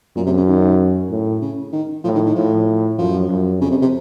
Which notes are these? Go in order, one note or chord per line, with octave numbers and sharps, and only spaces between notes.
F#2 A#2
C3
C#3
D#3
A2
C#3
D#3
A2 F3
D#3
D#3
A2 F3
F#2 F3
F#2
F2 C#3
C3
C3